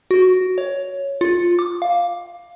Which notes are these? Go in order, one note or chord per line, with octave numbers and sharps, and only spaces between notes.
F#4
C#5
F4
D6
F5